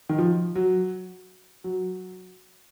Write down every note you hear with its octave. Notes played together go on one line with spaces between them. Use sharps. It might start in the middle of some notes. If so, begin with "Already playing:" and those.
D#3
F3
F#3
F#3